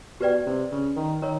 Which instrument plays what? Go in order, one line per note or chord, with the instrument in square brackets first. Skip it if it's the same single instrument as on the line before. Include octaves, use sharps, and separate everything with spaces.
[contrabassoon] B2 [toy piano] G4 B4 D5 G5
[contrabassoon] C3
C#3
D#3
[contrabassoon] D#3 [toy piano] A#4 C#5